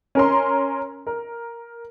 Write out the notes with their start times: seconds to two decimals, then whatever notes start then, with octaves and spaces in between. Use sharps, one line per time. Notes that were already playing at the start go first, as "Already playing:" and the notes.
0.15 C#4 A#4 A#5 C6
1.07 A#4